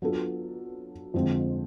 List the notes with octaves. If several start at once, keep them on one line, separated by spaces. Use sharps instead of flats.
F#3 B3 D4 F4 A4
F2 D3 F3 G#3 C4